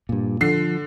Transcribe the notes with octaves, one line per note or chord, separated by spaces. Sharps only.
G2 A#2
D3 F3 C7